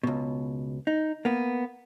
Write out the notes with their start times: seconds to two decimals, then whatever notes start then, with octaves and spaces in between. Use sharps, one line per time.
0.03 C#2 B2
0.87 D#4
1.25 A#3 B3